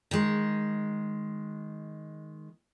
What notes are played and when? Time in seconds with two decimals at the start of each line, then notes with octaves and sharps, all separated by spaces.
0.11 D#3 G#3